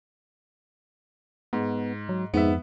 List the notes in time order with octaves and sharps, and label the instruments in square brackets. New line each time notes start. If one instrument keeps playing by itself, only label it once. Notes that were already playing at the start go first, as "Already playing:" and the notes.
[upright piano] G#2 [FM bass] B3
[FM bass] F#3
[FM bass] F2 [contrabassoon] G#2 [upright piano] B3 E5